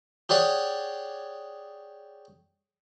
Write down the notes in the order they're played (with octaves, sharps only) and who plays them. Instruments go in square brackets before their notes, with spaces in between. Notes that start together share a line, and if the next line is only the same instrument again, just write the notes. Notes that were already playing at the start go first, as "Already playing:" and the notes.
[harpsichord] G4 G#4 C#5 D5 F#5